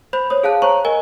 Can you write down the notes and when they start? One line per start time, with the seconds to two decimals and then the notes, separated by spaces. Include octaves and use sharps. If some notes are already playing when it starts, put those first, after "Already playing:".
0.13 C5 B5 G6
0.30 C5 C#5 D#6
0.43 G#4 F5 A5 F#6
0.62 C5 C#5 A#5 C#6
0.85 A#4 D#5 G#5 G7